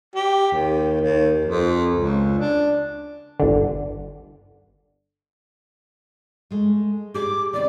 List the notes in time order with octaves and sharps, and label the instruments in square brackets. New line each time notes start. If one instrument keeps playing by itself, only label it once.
[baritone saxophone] G4
D#2
D#2
F2
C#2
D4
[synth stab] G1 D3
[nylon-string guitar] G#3 A3
[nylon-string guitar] G4 G#4 [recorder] D6
[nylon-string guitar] D#3 C4 [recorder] D5